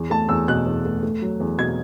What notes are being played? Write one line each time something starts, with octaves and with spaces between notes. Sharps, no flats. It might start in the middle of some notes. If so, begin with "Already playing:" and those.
Already playing: E2
A3 A5
E2 E6
B2 F#6
E2
A3
A3
F#3
E2
B2 G#6